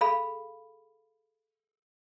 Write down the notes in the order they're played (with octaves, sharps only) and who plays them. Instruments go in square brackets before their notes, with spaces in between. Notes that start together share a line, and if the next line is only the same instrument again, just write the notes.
[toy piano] G#4 A4 F5 B5